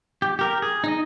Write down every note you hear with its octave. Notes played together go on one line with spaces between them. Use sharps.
G4
G4 A#4
G#4
D#4 D#5